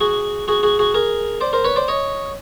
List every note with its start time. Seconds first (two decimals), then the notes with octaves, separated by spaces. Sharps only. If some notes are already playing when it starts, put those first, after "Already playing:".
0.01 F#4 G#4
0.48 F#4 G#4
0.63 F#4 G#4
0.79 F#4 G#4
0.94 G#4 A#4
1.41 C5 D5
1.53 A#4 C5
1.64 B4 C#5
1.76 C5 D5
1.88 C#5 D#5